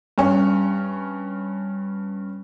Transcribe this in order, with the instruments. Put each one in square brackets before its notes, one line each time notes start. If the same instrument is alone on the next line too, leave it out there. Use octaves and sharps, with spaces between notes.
[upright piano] G2 C#4